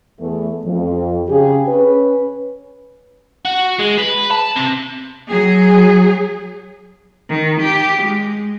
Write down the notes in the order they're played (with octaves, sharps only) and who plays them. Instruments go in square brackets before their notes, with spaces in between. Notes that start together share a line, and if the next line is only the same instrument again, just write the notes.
[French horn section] E2 A3
F2
C#3 G4 G#4
C#4 B4
[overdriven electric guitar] F#4
G#3
B4
A5
C3
[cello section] F#3 G#4
[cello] D#3
G4
G#3